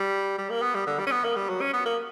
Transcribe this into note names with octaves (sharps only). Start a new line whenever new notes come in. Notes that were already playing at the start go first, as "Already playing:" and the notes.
Already playing: G3
G3
A#3
B3
G3
D3
G3
C#4
B3
A#3
G3
F#3
C#4
B3
A#3